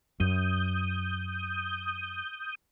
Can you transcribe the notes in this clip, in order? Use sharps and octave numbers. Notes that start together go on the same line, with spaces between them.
F#2 D#6 G6